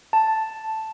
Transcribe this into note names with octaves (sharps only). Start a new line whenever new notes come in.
A5